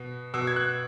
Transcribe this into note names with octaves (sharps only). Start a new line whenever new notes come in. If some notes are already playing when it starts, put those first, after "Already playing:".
Already playing: B2
B2 E6
G#6
F#6